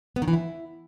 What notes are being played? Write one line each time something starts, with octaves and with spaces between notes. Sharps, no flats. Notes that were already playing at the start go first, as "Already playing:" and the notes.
B3
D#3
E3
E4